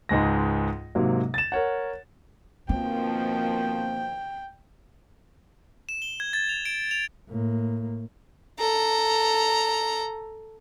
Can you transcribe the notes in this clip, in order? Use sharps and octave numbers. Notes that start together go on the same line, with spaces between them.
C#2 G#2 G#3 A#6
G#2 C3 F#3 A#3
A6 E7
A#4 C#5 F#5
B2 D#3 F3 A#3 C4 G5
E7
G7
G#6
A6
F7
D7
F7
A2 A#3
A4 A#5